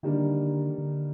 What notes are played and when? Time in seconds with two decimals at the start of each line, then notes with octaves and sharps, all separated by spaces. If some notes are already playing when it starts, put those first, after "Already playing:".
0.03 D3 D#3 G3 A#3 D4
0.78 D3